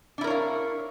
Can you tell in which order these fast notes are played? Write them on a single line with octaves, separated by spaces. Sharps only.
D4 E4 A#4 C#5 F5